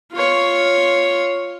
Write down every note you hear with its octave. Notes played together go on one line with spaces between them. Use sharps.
F4 C#5